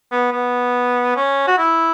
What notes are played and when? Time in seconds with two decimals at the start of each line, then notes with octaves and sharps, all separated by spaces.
0.12 B3
0.32 B3
1.16 C#4
1.48 F#4
1.58 E4